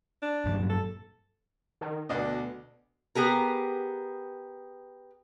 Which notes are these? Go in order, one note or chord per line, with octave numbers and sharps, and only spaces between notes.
D4
G2 A#2 F#3
A4
D#3
D2 B2 D4 D#5
B3 G4 G#4 A#4